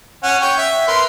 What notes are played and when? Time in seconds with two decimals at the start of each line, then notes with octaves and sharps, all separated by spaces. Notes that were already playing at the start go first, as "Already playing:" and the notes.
0.23 C#4 F#5
0.42 C#5 G5
0.58 E5
0.88 A#4 B4 C6